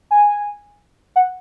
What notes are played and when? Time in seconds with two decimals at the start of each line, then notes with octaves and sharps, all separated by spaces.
0.11 G#5
1.16 F#5